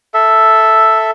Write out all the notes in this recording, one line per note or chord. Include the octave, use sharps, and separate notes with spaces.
A4 E5